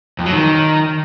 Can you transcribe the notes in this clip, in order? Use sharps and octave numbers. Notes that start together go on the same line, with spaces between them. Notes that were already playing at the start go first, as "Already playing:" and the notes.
F2
F#3
D#3